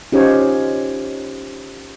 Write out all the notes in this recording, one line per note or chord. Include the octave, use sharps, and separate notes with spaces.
C#4 D#4 F4 G4 C5 C#5